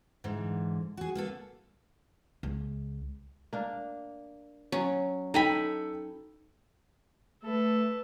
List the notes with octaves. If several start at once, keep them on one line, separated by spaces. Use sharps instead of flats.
G#2 D3 E3
F#4 G#4
A#3 B3 A4
C#2
A#3 D4
F#3 C#4
D#4 A4 G5 G#5 B5
A3 A4 B4